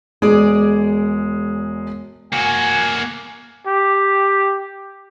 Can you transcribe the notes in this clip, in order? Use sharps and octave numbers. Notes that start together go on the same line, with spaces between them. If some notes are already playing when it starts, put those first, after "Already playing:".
E1 G#3 G#4 D5
A#3 F#4 G#5
G4